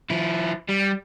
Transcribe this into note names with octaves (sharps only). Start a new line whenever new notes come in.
F3 E4
G3